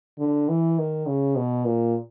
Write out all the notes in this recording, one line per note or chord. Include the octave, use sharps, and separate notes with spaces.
D3
E3
D#3
C#3
B2
A#2